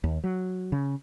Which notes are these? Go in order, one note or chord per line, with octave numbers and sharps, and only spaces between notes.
D#2
F#3
C#3